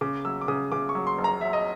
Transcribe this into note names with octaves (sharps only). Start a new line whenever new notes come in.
C#3 D6
F#3 E6
D6
C#3 D#6
C#3 D6
C#6
F#3
C6
F#1
A#5
F#3 E5
D#5